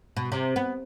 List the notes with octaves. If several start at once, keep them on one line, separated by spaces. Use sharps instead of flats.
B2
C3
B3